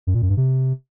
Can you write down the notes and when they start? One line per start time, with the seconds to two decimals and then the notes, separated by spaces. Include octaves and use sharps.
0.07 F#2
0.14 A#2
0.22 F#2
0.29 G2
0.37 C3